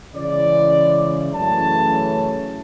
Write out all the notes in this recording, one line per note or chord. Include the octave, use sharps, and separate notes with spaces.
C#3 E3 G#3 D5
F#2 C#3 E3 A3 C#4 A5